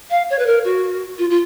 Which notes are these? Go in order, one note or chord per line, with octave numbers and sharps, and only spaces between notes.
F5
C#5
B4
A#4
F#4
F4
F4